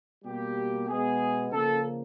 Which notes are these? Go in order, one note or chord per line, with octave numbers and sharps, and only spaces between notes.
B2 G3 A#3 G4
B2 G#3 B3 G#4
C#3 F3 A#3 A4